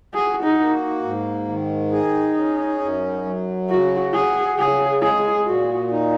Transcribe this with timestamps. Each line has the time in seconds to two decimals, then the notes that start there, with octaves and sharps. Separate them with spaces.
0.14 F#4 G#4
0.44 D#4
0.58 A#3
1.03 G#2
1.48 D#3
1.92 D#4 G#4
2.37 C#4
2.81 F#2
3.25 F#3
3.70 C#3 F#4
4.14 F#4 G#4
4.58 C#3 G#4
5.02 G#3 G#4
5.46 A#2 F#4
5.91 D#4